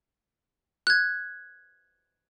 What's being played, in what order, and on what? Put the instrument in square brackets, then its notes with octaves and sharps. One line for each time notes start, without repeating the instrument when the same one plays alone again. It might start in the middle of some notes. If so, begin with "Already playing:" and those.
[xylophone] F#6 G#6